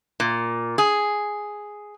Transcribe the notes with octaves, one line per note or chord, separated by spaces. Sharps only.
A#2
G#4